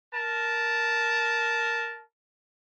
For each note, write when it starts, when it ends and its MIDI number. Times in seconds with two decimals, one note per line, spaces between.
0.13 2.02 70
0.13 2.02 81